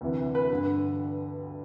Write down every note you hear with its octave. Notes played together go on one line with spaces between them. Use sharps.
D2 C3 E3
B4
G2 D3